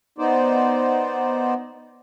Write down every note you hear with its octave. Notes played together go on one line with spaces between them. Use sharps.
B3 D#4 C5 D5